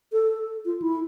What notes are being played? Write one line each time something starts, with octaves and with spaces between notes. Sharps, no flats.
A4
F4
E4